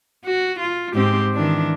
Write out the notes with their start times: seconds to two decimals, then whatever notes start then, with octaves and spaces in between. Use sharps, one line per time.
0.24 F#4
0.60 F4
0.94 G#2 C4 G4
1.34 D#3 E3 D4